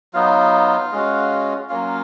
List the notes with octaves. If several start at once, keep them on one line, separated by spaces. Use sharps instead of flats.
F#3 B3 D#4 F4 F5
G#3 C#4 F#4
F#3 A#3 C#4 F4 F5